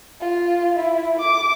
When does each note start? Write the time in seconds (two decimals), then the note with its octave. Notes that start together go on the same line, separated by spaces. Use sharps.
0.21 F4
0.76 E4
1.19 D6